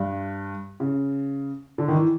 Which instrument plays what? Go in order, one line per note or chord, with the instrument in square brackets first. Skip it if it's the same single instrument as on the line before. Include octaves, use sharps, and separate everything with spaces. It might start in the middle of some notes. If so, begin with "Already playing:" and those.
Already playing: [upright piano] G2
C#3
D3
D#3
E3